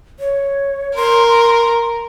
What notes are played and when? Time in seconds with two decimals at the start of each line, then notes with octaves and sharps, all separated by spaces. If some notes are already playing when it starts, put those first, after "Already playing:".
0.20 C#5
0.96 A#4 C6